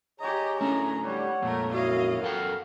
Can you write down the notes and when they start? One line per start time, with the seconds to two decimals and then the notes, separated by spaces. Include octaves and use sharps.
0.20 G4 G#4 C#5 D#5 A#5
0.61 A3 C#4 D4 E4 A#4 A#5
1.03 G3 C#5 F#5
1.42 F2 A#2 A3 A#4
1.73 F#2 E4 F#4 C#5 D#5 F5
2.22 F#2 F#4 A4 A#4 F5 G5